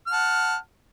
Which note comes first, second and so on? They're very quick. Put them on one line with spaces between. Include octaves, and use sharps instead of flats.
F6 F#5 A5